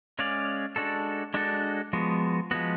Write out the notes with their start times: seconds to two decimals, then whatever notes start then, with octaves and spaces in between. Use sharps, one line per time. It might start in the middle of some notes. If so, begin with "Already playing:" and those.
0.19 G#3 C#4 G#4 D5 F5
0.76 G#3 D4 F#4 A4
1.34 G#3 D4 F#4 A4
1.93 F3 G#3 B3 F#4
2.51 F3 G#3 B3 F#4